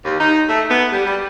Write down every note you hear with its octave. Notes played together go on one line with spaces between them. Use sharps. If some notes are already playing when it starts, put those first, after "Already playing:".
D#2
D#4
A3
B3
G3
G3